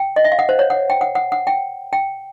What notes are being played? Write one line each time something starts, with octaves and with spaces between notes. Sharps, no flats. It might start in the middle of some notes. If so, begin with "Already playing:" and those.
Already playing: G5
D#5
E5
F5
F#5
C5
C#5
F#5
G5
F#5
F#5
F#5
G5
G5